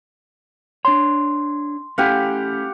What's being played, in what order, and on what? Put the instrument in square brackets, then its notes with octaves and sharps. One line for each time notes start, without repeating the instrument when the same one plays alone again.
[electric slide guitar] D4 C#5 [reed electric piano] C6
[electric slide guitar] A3 C#4 E4 [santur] G4 F5 F#5